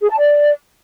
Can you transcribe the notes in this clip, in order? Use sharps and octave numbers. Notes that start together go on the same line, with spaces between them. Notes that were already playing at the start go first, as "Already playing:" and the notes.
G#4
A5
D5